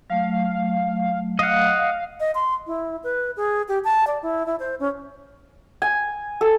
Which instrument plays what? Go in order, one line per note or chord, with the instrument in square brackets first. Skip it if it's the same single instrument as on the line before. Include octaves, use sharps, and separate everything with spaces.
[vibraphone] F#3 A3 [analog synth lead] F5
[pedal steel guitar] D#5 F#5 [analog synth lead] F5
[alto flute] D#5
C6
E4
B4
G#4
G4
A5
D5
E4
E4
C5
C#4
[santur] G#5
A4